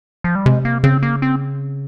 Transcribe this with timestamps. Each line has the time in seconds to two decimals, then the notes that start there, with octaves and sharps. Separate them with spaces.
0.24 F3
0.35 G3
0.46 C3 G#3
0.65 A#3
0.84 C#3 C4
1.03 A#3
1.22 C4